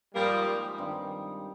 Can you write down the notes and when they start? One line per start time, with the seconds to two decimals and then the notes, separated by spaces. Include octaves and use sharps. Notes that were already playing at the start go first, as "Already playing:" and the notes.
0.15 G#2 F3 G3 G#3 A#3
0.78 G2 D#3 G3 C4